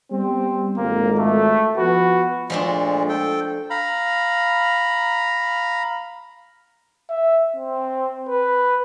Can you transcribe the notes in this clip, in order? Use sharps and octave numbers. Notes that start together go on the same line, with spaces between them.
G3 B3 C4
G#1 F2 A#3
A3
F3 B3 F#4 B4
A#2 F3 G#3 A3 D4
A4 G5
F5 A#5 B5
E5
C4
B4